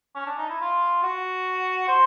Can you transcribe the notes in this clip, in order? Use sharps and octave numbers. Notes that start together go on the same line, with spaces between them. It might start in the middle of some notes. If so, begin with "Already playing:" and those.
C#4
D4
D#4
E4
F4
F#4
C5